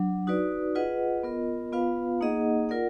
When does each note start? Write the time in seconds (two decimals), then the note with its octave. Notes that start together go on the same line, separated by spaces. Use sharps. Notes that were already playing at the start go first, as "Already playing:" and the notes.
Already playing: F#3 D4
0.27 D#4 F#4 B4 D5
0.75 F4 G#4 B4 D#5 F#5
1.23 B3 F4 A#4 D#5
1.72 B3 F4 B4 F5
2.21 A#3 D#4 G#4 D#5 F#5
2.69 F4 A#4 D5 F#5